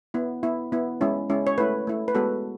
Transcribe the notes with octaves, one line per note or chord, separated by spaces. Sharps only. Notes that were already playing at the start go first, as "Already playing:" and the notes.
B3 E4
B3 E4
B3 E4
G#3 C#4 E4
G#3 C#4 E4
C#5
A3 E4 B4
A3 E4
B4
G#3 B3 F#4 A4